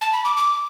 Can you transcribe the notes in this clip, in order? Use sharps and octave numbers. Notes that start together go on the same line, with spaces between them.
A5
B5
D6
D6